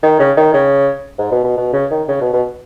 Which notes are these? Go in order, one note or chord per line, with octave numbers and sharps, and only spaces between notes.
D#3
C#3
D#3
C#3
G#2
B2
B2
B2
C#3
D#3
C#3
B2
B2